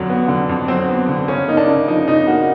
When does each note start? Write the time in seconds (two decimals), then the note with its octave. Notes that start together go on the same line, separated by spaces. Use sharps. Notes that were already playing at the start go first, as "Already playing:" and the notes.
Already playing: F2 D3 F#3
0.10 B3
0.28 D3
0.49 F2
0.68 F#3 C4
0.89 B3
1.09 D3
1.28 C#3 C#4
1.48 A#3 D#4
1.57 D4
1.67 C#3
1.88 F3 D#4
2.08 C#3 D#4
2.27 A#3 F#4